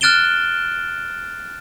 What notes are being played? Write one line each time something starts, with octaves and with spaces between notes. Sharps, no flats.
F6 F#6 A6 D7 E7 G7